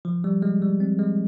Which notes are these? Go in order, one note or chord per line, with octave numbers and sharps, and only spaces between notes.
F3
G3
G#3
G3
C4
G#3